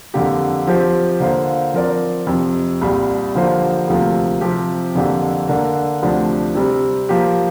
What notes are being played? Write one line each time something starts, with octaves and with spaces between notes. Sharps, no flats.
F2 D3 A#3 G4
F3 C4 G4 C5
D3 A#3 F4 C5
F3 C4 A#4 D5
F2 C3 F3
C2 A#2 G3
D3 F3 A#3 G4 C5
D2 C3 F3 A#3
C3 F3 C4 G4
F2 D3 A#3 D4 G4
D3 A#3 D4 A#4
D2 C3 F3 D4
C3 G3 C4
F3 A#3 G4